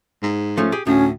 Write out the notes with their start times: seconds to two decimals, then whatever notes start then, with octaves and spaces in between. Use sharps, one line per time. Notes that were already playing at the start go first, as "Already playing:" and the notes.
0.23 G#2
0.57 F3 A3 C#4
0.72 G4 G#4
0.87 D2 A2 C#4